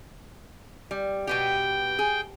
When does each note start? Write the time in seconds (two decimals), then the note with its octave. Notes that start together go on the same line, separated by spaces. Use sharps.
0.91 G3
1.27 B2 B3 G4 G5
1.99 G#4